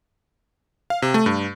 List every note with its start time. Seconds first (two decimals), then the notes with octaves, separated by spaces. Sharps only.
0.90 F5
1.02 C3
1.14 A3
1.26 G2